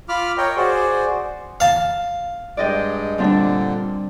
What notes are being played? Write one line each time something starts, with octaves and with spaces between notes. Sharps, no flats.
F4 B5 D6 F6
A#4 C#5 D#5 G5
F#4 G#4 C5 D5
F5 A5
G2 G#3 D5 D#5 G5
A#2 D3 G3 C4 D4